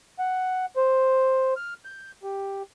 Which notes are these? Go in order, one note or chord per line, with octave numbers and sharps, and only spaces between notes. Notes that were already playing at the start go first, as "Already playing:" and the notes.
F#5
C5
F6
G6
G4